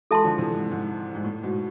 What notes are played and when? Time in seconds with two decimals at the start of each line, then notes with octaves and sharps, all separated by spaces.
0.11 E3 G#3 A4 E5 A5 C6
0.24 D3 F3
0.38 C3 E3
0.54 G#2
0.71 G#2
1.15 G#2
1.24 A2
1.43 G#2 B2